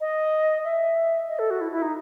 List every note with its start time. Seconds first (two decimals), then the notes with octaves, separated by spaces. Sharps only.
0.01 D#5
0.64 E5
1.29 D#5
1.39 A4
1.50 F#4
1.61 E4
1.72 E4
1.82 D#4